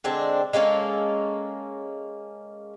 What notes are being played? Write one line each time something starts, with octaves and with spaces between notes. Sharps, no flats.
D3 G#3 C4 D4
G#3 A#3 C#4 A4